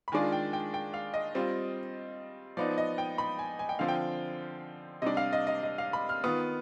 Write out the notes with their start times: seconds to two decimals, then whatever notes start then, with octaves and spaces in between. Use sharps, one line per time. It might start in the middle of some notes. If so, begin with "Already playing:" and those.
0.08 B5
0.12 D#3 G#3 D4 F4 G#5
0.32 G5
0.53 G5
0.74 G5
0.94 F5
1.14 D#5
1.35 G3 C4 F4
2.57 F3 B3 D#4 D5
2.78 D#5
2.98 G5
3.18 B5
3.39 G#5
3.59 G#5
3.69 G5
3.79 D3 F3 C4 F5
3.88 G5
5.02 C3 G3 D4 D#5
5.17 F5
5.33 D#5
5.47 D#5
5.63 D#5
5.78 F5
5.93 B5
6.09 F6
6.24 D#3 B3 F4 D#6